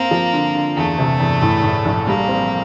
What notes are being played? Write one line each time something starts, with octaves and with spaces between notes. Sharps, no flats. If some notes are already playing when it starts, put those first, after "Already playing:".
Already playing: A#3 C4
F3
D3
D3
E2 A3
C3
E2
A2
A2
A#1
G3 A#3
C4